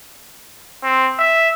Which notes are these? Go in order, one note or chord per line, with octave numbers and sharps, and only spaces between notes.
C4
E5